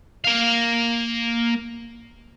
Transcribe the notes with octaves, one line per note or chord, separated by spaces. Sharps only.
A#3 F5